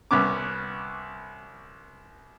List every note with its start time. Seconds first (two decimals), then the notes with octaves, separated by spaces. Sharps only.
0.11 C2 B3 C#4 D6